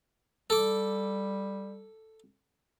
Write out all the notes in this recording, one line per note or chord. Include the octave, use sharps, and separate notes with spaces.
G3 A4 D6